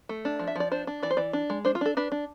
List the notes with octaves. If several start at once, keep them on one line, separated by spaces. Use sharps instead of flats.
A3
D4
F3
E5
F3 D5
D4 C5
D4
E3 D5
C5
E3 D5
D4
G#3
D4 C5
F4
D4 A4
D4 B4
D4